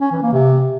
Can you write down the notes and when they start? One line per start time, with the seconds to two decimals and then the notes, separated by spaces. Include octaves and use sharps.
0.01 C#4
0.11 E3
0.22 A#3
0.33 C3